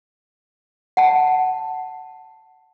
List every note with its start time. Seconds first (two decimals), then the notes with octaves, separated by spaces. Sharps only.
0.97 F#5 A5